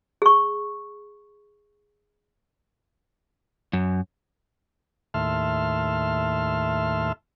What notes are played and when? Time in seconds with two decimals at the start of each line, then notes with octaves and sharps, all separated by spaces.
0.22 G#4 C#6
3.73 F#2
5.14 D#2 A2 E5 A5 C6 F6